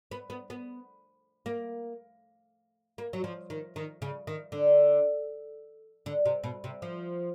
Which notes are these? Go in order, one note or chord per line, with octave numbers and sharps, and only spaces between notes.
B3
B3
B3
A#3
A#3
F#3
F3
D#3
D#3
C#3
D#3
D3
D3
C3
B2
C3
F3